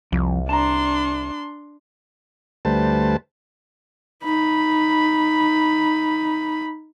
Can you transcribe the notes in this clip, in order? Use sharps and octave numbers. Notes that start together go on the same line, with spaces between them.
C2 F2
D4 A5 A#5 C6
D2 G3 A3 B4 C5 A5
D#4 B5